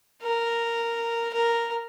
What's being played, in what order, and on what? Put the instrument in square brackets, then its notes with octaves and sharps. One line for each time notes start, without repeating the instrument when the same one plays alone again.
[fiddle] A#4
A#4